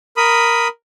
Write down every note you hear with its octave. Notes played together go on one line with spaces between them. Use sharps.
A#4 B5 D#6